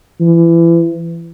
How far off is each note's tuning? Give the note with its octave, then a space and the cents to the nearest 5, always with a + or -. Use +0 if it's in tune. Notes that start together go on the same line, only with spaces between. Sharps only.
E3 +25